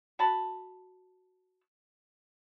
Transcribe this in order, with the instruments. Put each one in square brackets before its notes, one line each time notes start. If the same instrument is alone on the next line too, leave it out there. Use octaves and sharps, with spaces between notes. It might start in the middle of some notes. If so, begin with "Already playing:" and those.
[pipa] F#4 A5 B5